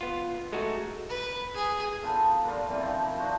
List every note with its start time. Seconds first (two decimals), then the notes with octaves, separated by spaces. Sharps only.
0.01 B3 F4
0.52 G#3 A3 D#4 F#4
1.09 B4
1.55 G#4
2.02 B3 D#4 F4 A4
2.44 G2 A#2 F4
2.67 E3 G3 C4 E4
2.81 D#3 F3 D#4
3.18 D4 D#4 F#4 C5